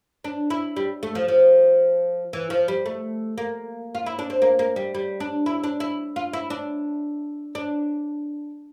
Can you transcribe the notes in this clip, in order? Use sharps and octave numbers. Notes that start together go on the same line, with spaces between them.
D4
E4
G3
A3
F3
F3
E3
F3
G3
A3
A#3
F4
E4
D4
C4
A#3
A#3
G3
G3
D4
E4
D4
E4
F4
E4
D4
D4